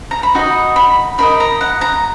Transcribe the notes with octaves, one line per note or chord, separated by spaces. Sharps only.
A#5
B5
D#4 F#4 D#5
B5
D#4 A#4 D#5 B5
A#5
F#5
A#5